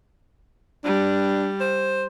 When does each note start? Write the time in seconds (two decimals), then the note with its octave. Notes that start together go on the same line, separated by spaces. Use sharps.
0.84 G3 D4
1.61 C5